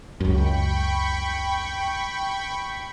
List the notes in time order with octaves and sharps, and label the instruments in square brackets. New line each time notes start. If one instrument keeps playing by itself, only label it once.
[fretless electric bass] C#2 F#2 [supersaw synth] G5 B5 C#6